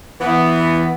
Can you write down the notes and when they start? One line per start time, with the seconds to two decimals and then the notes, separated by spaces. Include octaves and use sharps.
0.21 E3 B3